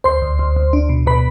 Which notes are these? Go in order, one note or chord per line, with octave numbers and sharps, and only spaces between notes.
D2 C5 C6
D2
D2
D2
D4
B2
B2 B4 B5